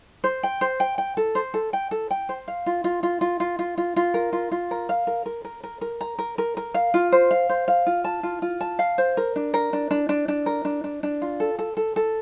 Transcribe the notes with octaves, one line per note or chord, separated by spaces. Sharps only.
C5
G5
C5
G5
G5
A4
C5
A4
G5
A4
G5
C5
F5
F4
F4
F4
F4
F4
F4
F4
F4
A#4
F4
F4
A#4
F5
A#4
A#4
A#4
A#4
A#4
A#5
A#4
A#4
A#4
F5
F4
C5
F5
C5
F5
F4
A5
F4
F4
A5
F5
C5
A#4
D4
A#4
D4
D4
D4
D4
A#4
D4
D4
D4
F4
A4
A4
A4
A4